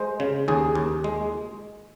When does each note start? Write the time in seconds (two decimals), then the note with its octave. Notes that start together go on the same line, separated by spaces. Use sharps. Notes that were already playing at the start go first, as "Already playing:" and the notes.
Already playing: G#3 C5
0.20 C#3
0.48 D#2 G#4
0.75 D#2
1.04 G#3